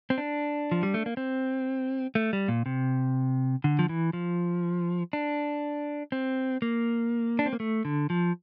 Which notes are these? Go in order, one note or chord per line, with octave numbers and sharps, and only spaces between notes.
C4
D4
F3
G3
A3
A#3
C4
A3
G3
A#2
C3
D3
F3
E3
F3
D4
C4
A#3
D4
C4
A#3
A3
D3
F3